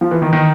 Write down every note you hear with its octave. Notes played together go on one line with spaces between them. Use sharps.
F3
E3
D#3
D#3